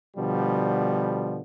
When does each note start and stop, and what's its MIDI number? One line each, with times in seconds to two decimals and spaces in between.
0.16 1.41 47
0.16 1.41 50
0.16 1.41 53
0.16 1.41 55